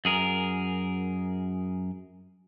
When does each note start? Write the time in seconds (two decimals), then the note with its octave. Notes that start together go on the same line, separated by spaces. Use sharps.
0.05 F#2 G#4 A#4